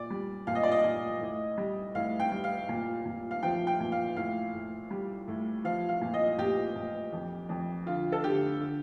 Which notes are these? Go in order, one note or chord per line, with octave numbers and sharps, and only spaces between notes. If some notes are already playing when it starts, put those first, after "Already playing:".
Already playing: A#2 D5
G3
A#2 F5
D#5
D5
D#5
A#2
A2
G3
A2 F5
G5
G3
F5
A#2
A#2
F5
F3 G5
G5
A#2
F5
A2 F5
A2
G3
A2
F3 F5
F5
A#2
D#5
A#2 G4
A#2
F2
F2
D3 F4
A4
D3 G4
D3